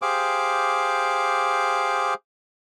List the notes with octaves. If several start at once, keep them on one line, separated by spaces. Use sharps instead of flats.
G4 G#4 C5 F5 D6